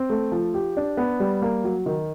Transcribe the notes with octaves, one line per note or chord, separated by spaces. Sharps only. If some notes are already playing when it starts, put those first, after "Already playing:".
Already playing: C4
A3
F3
G4
D4
B3
G3
A#3
F#3
D#3